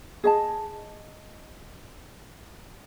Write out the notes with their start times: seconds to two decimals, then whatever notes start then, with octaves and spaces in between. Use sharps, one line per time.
0.24 G#4 D#5 A5